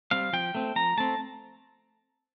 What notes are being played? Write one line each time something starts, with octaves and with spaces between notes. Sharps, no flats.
G3 C4 F5
F3 G5
A3 C4
F3 A#5
A3 C4 A5